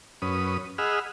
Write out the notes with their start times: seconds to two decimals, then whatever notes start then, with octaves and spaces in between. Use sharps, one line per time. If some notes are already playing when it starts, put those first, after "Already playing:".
0.22 F#2 C#4 B4 D#6
0.78 G#4 D#5 F#5 B5 E6 F6